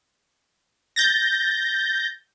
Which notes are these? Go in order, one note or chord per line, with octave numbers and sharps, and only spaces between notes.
G6 A6 A#6